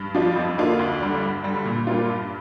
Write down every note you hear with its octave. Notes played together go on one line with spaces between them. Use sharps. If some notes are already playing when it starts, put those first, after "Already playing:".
Already playing: G2
F3 D4 F4
F2
D3 A#3 D4 F4
D2
D3 G3 D4
G2
D3 G3
A#2
G3 A#3 D4 F4
G2